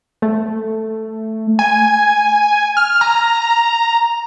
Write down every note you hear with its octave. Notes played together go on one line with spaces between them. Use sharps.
A3
G#5
F6
A#5